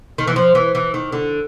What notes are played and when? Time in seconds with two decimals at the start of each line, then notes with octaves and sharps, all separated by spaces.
0.18 D#3
0.27 E3
0.36 F3
0.55 E3
0.75 E3
0.94 D#3
1.12 D3